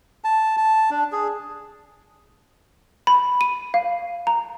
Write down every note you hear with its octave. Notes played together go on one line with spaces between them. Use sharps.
A5
A5
D4
G#4
B5
D#7
F5
A#5